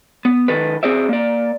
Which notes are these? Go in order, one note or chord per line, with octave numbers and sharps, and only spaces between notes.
B3
D#3 A4 B4
C4 G#4 C5 D5 E5
A#3 D5